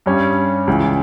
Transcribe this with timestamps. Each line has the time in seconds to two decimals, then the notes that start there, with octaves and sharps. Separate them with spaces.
0.06 G2 G3 C#4
0.67 C#2 C#3 E3